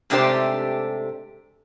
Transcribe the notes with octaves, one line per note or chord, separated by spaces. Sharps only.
G#2 C3 A3 D4 G4 C5